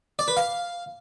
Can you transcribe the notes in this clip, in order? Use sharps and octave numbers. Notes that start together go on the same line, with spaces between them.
D5
B4
F5